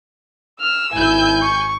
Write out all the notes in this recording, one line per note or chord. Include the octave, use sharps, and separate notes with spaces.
E6 F6
G#1 E4 G#5 G6
C#6